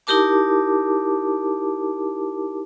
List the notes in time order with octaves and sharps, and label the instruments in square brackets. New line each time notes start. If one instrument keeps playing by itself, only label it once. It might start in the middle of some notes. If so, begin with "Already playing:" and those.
[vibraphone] D#4 E4 G4 A#4 A5 D6